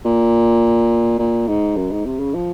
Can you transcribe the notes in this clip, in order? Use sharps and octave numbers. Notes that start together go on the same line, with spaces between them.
A#2
A#2
G#2
F#2
G#2
C3
C#3
F3